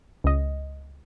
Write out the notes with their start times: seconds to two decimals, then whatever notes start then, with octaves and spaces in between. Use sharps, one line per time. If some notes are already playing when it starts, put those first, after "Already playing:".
0.24 C#2 D#5